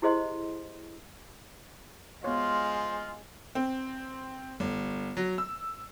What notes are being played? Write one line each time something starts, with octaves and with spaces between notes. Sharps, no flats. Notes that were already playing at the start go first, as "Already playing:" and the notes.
E4 G4 G#4 C5 D#5 C6
G#3 B3 F4 C5 C#5
C4
G1
F#3
E6